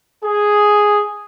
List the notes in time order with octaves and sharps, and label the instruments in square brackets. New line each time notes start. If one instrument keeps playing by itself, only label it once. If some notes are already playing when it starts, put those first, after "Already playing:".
[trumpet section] G#4